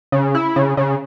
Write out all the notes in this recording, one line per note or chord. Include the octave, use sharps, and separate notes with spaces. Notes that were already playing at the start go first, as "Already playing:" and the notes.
C#3
E4
C#3
C#3